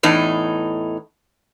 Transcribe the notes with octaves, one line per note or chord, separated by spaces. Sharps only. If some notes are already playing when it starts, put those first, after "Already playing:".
E2 A2 D#4